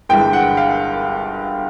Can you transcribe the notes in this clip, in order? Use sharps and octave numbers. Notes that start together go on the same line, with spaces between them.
G1 G2 E3 G#3 G5
F#5
F5